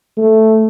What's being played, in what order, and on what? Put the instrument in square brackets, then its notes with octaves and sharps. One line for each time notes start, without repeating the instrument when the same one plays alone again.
[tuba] A3